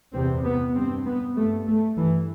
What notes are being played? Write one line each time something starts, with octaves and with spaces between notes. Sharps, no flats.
E2 C3 C4
B3
G2 C4
B3
G2 A3
A3
G2 E3